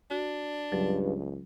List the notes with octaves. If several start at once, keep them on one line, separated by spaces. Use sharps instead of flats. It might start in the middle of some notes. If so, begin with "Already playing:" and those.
D4 F#4
C#2 G2 F#3